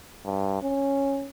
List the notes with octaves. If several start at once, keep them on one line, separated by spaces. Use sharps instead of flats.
G2
C#4